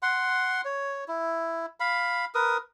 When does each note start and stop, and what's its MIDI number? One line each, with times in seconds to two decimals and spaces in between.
0.02 0.61 78
0.02 0.61 84
0.65 1.04 73
1.08 1.66 64
1.80 2.25 77
1.80 2.25 83
2.35 2.57 70
2.35 2.57 71
2.35 2.57 87